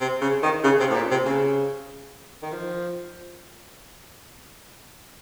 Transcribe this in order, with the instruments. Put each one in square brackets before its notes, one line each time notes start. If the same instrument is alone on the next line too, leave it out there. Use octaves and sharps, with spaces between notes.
[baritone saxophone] C3
C#3
D#3
C#3
C3
A2
A#2
C3
C#3
D#3
F3